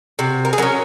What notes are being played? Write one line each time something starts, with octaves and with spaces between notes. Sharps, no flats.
C3 F#4
A#4
G#4
F#3 C#4 A#4